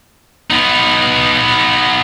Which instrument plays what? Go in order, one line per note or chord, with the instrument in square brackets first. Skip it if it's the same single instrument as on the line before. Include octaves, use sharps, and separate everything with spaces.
[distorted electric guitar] B3 D#4